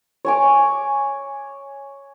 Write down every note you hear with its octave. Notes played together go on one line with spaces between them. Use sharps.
C#5 G#5 D6